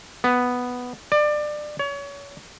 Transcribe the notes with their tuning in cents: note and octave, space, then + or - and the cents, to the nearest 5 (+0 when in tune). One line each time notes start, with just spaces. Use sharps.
B3 +0
D5 +25
C#5 +30